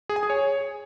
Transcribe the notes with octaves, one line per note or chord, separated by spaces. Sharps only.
G#4
G#5
G#4
C#5